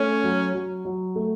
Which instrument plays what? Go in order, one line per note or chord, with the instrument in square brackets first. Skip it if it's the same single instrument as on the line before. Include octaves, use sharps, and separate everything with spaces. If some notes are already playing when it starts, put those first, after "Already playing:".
Already playing: [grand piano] A3 [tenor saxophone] C#4
[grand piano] F#3
F#3
F#3
A3